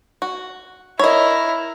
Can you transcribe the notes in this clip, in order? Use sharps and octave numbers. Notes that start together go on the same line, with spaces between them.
F#4
E4 A#4 C#5 D#5